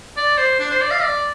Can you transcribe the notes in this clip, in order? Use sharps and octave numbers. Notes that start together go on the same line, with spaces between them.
D5
C5
D4
C5
D5
F5
D5